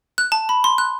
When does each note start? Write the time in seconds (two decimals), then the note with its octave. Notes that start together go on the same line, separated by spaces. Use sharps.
0.18 F#6
0.32 A5
0.49 B5
0.64 C6
0.78 F#6